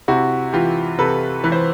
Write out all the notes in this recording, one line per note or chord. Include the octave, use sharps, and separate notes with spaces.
C3 E4 F#4
E3 F4 G4
C3 A4 B4
E3 B4
C5